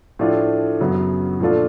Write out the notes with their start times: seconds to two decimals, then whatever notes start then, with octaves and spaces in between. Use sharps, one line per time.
0.19 A2 F3 A3 D4 F4
0.81 F#2 C#3 F#3 B3
1.40 A#2 F3 A3 D4 F4